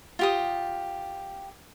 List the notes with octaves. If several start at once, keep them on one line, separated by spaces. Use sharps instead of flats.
F4 G4 D#6